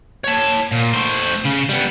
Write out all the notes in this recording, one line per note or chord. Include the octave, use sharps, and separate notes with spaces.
C#5 A5
A#2
A3 C5
C#3
G3 B3